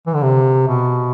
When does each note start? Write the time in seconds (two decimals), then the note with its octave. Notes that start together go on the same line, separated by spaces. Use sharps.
0.07 E3
0.15 D3
0.23 C3
0.68 B2